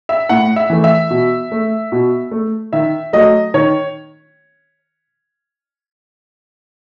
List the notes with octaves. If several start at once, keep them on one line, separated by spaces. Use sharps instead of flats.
E5
A2 F#5
E5
E3 A3
E5
B2
A3
B2
A3
D#3 E5
F#3 A3 D#5
D#3 C#5